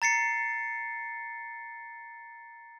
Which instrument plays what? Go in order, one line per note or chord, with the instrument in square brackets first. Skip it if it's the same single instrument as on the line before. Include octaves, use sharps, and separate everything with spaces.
[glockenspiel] A#5 A6 C7 C#7